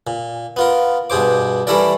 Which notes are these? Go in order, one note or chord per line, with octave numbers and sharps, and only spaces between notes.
A#2
B3 F4 A#4
G2 B2 G#4 C5 D6
E3 G3 A3 E4 A#4 D5